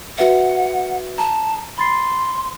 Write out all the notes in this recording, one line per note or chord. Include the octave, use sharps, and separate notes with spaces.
F#4 B4 E5 F#5
A5 A#5
B5 C6 A6 C7